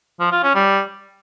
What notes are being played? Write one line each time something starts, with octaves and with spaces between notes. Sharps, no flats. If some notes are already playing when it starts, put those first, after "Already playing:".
F3
F4
C#4
G3